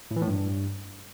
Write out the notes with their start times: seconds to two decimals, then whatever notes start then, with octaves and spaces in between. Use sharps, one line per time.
0.11 A2
0.16 E3
0.22 A2
0.27 G2